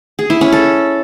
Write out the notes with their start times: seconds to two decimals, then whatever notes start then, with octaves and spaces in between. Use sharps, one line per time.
0.19 G#4
0.30 E4
0.41 C#4
0.52 A4